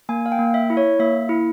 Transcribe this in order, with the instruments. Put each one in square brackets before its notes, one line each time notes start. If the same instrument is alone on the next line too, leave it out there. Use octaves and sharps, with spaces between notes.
[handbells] A#3 G#5
F5
G5
A#3
E5
E4
C#5
A#3 E5
E4